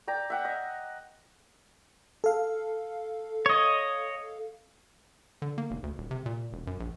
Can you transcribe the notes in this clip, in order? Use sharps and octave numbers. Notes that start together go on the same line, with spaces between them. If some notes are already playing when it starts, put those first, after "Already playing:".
D5 G5 A#5
E5 F#5 G5
D#5
A4 F5
C#5 D#5
D3
A#3
F1
D2
D#1
C3
A#2
E1
F#2
A#1